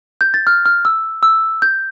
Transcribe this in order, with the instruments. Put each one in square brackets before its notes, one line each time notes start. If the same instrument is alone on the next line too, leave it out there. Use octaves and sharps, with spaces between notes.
[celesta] G6
A6
F6
F6
E6
E6
G6